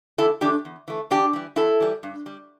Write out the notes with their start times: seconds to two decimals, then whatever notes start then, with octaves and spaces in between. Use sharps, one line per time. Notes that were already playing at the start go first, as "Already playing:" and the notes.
0.18 E2 E4 A4
0.41 E3 D4 G4
0.45 A3
0.65 E2
0.88 E3 A3
1.10 E2 D4 G4
1.33 E3 G3
1.56 E2 E4 A4
1.80 E3 G3
2.03 G2
2.26 G3